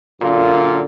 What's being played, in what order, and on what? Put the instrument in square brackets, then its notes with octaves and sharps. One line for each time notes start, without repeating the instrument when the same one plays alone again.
[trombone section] F#2 A#2 D3 F4